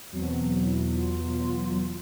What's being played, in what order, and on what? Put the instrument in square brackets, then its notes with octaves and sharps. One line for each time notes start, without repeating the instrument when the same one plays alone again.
[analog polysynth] E2 B2 F#3 [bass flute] C4
[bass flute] E4
F4